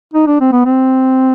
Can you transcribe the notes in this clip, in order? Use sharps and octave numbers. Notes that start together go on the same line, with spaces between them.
D#4
D4
C4
B3
C4